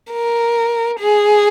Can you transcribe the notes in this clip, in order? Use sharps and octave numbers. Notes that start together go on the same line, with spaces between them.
A#4
G#4